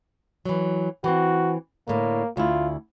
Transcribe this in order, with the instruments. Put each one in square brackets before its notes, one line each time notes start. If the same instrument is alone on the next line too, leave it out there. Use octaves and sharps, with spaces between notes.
[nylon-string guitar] E3 F#3
[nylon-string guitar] E3 C4 [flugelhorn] F#4
[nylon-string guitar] A2 D3 [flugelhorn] A#3
[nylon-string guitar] D2 E4 [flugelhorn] F4